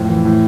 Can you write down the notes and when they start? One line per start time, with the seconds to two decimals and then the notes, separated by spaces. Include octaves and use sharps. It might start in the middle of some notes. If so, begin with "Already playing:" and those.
Already playing: F2 A2
0.09 E3
0.25 A2